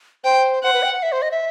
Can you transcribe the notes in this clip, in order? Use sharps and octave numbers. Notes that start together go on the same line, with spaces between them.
C5 G5
C5 F#5
B4
G5
F#5
E5
C5
D#5
E5